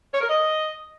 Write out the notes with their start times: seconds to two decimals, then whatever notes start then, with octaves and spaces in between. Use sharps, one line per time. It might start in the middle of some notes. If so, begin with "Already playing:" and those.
0.13 C#5
0.20 A#4
0.28 D#5